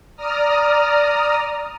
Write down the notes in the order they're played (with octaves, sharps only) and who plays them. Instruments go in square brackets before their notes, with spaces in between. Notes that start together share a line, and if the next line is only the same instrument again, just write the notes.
[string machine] D5 A#5 D#6 F6